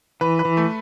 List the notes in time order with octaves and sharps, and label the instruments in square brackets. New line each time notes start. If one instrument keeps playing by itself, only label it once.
[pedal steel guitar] E3 [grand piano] B4
[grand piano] B4
[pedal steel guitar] E3
[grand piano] A3